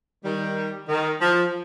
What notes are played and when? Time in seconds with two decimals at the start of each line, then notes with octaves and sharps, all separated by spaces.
0.24 D#3 G3
0.88 D#3
1.21 F3